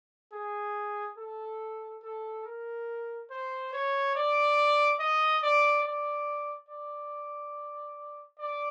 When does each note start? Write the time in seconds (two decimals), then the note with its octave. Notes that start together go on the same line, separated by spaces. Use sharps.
0.33 G#4
1.18 A4
2.03 A4
2.45 A#4
3.31 C5
3.73 C#5
4.16 D5
4.99 D#5
5.43 D5
5.84 D5
6.69 D5
8.39 D5